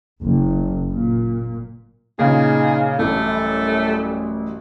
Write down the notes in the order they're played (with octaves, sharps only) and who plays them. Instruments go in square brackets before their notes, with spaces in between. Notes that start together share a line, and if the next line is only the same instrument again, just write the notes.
[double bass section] F#1
A#2
[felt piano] A#2 C#3 [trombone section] D#4 [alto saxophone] G#4
[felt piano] A1 [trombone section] F#2 G3 [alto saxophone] A3